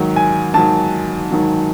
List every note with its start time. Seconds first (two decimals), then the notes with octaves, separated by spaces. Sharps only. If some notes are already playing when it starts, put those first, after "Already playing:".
Already playing: G#2 D#3 F#3
0.16 G#5
0.54 G#2 D#3 F#3 A5
1.31 G#2 D#3 F#3